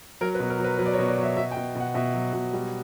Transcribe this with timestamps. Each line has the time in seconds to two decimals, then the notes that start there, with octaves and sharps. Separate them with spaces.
0.21 F#3 A#4
0.35 B4
0.40 B2
0.50 A#4
0.59 F#3
0.64 B4
0.79 F#3 B4
0.86 D5
0.94 C#5
0.99 B2
1.07 D5
1.17 F#3
1.23 E5
1.37 B2 E5
1.51 G5
1.57 B2
1.76 B2 F#5
1.94 B2 E5
2.15 F#3
2.33 B2
2.53 G3